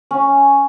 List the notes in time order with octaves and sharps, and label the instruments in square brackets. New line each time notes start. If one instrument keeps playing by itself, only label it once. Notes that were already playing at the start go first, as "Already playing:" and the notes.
[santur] C#4